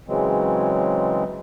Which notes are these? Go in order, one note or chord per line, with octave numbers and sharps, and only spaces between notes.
C#3 E3 F#3 G#3 C4